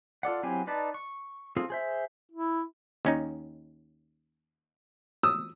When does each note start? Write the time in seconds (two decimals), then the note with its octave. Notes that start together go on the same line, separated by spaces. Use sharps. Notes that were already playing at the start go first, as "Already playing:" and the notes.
0.23 F4 A4 D5 F#5
0.43 F#3 C4 E4 G4 G#5
0.67 D#4 B4 D5 A5
0.94 C#6
1.57 C4 F4 G#4 A4
1.70 G#4 C5 E5
2.32 E4
3.05 D#2 C#4 D#4
5.23 D#6 E6